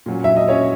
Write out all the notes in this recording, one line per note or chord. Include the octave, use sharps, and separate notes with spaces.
A#2 F#3 C#4
E5
D#5
C#4 C#5